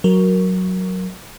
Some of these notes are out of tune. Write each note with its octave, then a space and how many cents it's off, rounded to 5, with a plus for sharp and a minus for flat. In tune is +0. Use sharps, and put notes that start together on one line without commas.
F#3 +0 A#4 +0